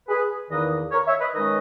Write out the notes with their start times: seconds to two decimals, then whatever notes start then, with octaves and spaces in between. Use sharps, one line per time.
0.08 G#4 B4
0.50 E2 D#3 A#3 D#4 B4 D#5
0.92 A#4 C#5
1.07 C#5 E5
1.20 B4 D#5
1.34 D#3 G#3 C#4 B4 D#5